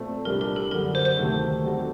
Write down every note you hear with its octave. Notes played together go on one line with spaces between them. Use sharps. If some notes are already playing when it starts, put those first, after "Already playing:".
Already playing: A#2 A3 C4 A4
C2 C3 G3 D4 A#4
A#4
A4
F#2 D3 G3 A#4
C5
C5
D2 C3 D#3 A3 C4
G3 C4 F#4 A4